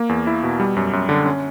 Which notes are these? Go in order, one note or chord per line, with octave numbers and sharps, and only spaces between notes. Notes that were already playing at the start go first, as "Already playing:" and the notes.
Already playing: A#3
E2
E4
B2
G3
F#2
F#2
D3
C#4